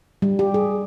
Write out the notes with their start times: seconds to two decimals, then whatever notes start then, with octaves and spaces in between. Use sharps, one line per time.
0.22 G3
0.39 G4
0.54 G#4